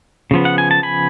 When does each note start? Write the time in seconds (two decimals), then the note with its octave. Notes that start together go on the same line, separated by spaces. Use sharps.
0.31 C#3 F3 B3
0.45 F#5
0.58 G#5
0.71 A5
0.83 G#5 B5